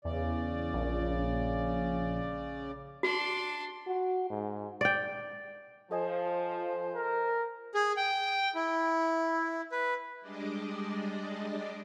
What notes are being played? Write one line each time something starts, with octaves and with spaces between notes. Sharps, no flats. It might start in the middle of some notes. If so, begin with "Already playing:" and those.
E2 C#3 D5
A#1
D4 F#4 C6
F#4
G#2
D5 G5
F3 A4 C5 D#5 G#5
A#4
G#4
G5
E4
B4
G3 G#3 D4 D5 D#5